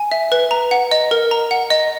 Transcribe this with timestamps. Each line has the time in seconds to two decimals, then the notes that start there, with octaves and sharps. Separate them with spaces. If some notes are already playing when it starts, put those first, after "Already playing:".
Already playing: G#5
0.12 E5
0.32 B4
0.51 A#5
0.71 F#5
0.91 D#5
1.11 A#4
1.31 A#5
1.51 F#5
1.70 D#5